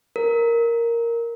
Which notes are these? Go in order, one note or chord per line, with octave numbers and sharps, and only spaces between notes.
A#4